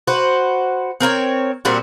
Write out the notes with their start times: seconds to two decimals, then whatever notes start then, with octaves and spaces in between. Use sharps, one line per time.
0.07 F#4 B4 C5
1.00 C4 A#4 C5 C#5
1.65 A#2 G3 C4 F#4